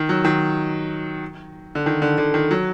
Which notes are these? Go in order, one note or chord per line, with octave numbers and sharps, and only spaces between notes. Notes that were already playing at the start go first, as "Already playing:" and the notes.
Already playing: D#3
F#3
D#3
D3
D#3
D3
D3
D#3
F#3